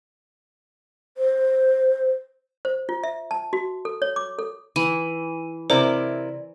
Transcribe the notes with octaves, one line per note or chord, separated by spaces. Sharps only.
C5
C5
F4
E5
A5
F#4
A4
C#5
D6
A4
E3 D#7
C3 E4 A#4 C5 D5